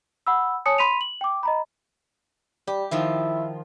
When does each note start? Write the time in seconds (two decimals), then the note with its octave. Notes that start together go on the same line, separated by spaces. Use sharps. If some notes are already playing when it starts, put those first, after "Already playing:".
0.27 F#5 B5 E6
0.66 C#5 G#5 A5 D#6 C#7
0.78 B5 C6 B6 D#7 F7
1.01 F#7
1.21 G5 D6
1.43 D#5 A#5 B5
2.67 G3 G4
2.91 D#3 F3 E4 F4